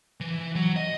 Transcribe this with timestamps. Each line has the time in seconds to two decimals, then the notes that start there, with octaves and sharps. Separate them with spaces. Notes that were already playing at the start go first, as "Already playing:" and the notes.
0.20 E3
0.55 F#3
0.76 D#5